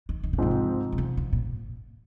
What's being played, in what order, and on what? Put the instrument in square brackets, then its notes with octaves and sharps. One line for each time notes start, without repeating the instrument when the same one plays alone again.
[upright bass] D#3
D#3
C#3
[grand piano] G#2 F3 C4 D#4 [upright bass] C3
[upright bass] C#3
C3
C#3
C#3
A#2